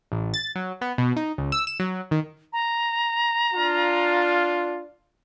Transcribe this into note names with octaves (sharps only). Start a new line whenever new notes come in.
A1
A6
F#3
B3
B2
D#4
C#2
E6
E7
F#3
D#3
A#5
D4 F4